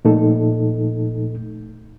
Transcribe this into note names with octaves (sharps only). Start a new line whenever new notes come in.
A#2 F3 A3 D#4 A4